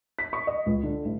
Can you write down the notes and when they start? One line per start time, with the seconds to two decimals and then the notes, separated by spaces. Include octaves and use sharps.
0.19 B6
0.33 C#6
0.47 D#5
0.66 C#2
0.83 D3
1.05 A1